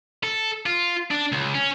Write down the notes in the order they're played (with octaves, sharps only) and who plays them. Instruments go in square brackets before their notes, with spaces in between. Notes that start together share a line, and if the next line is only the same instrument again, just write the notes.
[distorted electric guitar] A4
F4
D4
C#2
C#4